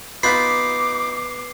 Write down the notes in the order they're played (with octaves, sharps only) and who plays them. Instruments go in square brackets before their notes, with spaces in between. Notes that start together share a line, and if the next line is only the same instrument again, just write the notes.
[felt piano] B3 F#6 B6 [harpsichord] D#4 F4 B5 [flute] D6 [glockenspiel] C7